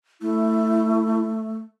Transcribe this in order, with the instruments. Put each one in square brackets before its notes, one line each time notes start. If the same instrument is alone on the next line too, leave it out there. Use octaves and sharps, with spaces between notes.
[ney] A3 [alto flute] E4